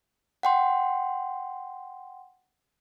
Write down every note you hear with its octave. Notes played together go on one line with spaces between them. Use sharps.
F#5 G5 C6